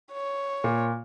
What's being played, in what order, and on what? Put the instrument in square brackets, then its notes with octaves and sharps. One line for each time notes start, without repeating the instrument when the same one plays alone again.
[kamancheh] C#5
[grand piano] A#2